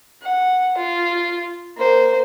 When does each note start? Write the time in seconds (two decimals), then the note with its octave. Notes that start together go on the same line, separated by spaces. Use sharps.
0.22 F#5
0.78 F4
1.77 A#3 C5